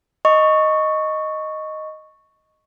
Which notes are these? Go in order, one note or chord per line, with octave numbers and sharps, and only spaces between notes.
D#5 C#6